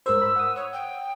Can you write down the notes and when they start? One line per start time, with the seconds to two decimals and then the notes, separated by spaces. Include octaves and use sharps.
0.06 G#2 A#4 C5 E6
0.21 B5
0.36 F#5 D#6
0.56 C#5
0.73 G5